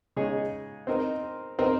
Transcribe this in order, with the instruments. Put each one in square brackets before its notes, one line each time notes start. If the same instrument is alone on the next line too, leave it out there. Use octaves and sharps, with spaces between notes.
[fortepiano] C#3 G#3 D#4 G#4 C#5
C4 D#4 A#4
C4 D#4 A#4